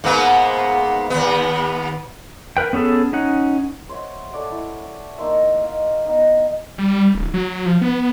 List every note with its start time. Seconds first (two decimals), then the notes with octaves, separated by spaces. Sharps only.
0.04 G#2 A#3 B3
1.10 D#2 B3
2.57 A#4 B4 G5
2.73 B3 C#4 G#4 A4
3.13 C#4 D#4 F#5
3.89 C5 C#5 E5 F#5
4.32 A4 C#5 D5 F#5
4.52 E4
5.18 A#3 D#4 C5 E5
5.61 D#5 F5
6.06 B3 D#4
6.78 G3
7.15 D1
7.34 F#3
7.66 F3
7.81 B3